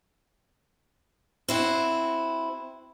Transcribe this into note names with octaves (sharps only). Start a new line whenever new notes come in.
C4 E4 F#4